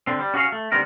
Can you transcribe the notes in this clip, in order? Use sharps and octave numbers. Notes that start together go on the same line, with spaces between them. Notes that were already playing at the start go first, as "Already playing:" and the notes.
D3 C4
G3
C#4 F#4 G#4 C#5 F5
A3
D2 G3 B3 C4 D#4 A#4